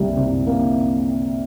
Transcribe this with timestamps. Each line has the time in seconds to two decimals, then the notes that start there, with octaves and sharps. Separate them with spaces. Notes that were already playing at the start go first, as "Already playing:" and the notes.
Already playing: C2 G3 A#3
0.17 C3
0.47 A#3